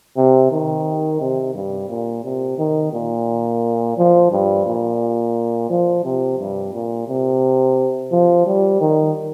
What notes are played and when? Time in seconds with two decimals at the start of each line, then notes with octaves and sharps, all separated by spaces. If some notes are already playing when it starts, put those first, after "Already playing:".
0.17 C3
0.51 D#3
1.20 C3
1.54 G2
1.89 A#2
2.24 C3
2.58 D#3
2.93 A#2
3.97 F3
4.31 G2
4.66 A#2
5.70 F3
6.04 C3
6.39 G2
6.73 A#2
7.08 C3
8.11 F3
8.46 G3
8.81 D#3